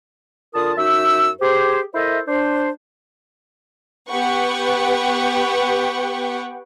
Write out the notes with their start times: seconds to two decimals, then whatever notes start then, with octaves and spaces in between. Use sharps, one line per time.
0.54 D3 F4 A#4 A5 D#6
0.77 F#2 D#4 F#4 E5 E6
1.40 G4 G#4 C5
1.94 E4 A4 A#4 C5 D#5 E5
2.27 D4 C5
4.08 B3 G4 B4 F#5 G5 C#6